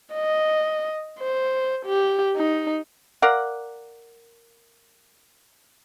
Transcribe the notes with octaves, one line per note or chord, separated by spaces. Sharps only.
D#5
C5
G4
D#4
A#4 D5 F5 F#5